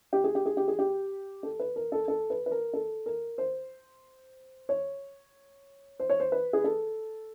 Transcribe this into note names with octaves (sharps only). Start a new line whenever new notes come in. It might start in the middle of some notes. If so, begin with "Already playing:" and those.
G4
G#4
G4
G#4
G4
G#4
G4
A4
B4
A#4
A4
A4
B4
B4
A#4
A4
A#4
C5
C#5
C5
C#5
C5
B4
G#4
A4